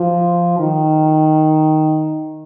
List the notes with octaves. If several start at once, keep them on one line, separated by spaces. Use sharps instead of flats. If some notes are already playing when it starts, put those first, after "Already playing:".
Already playing: F3
D#3